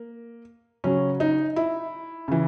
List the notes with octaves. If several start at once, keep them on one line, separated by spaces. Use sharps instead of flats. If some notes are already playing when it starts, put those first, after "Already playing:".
Already playing: A#3
C#3 F#3 C#4
D#4
E4
C#3 E3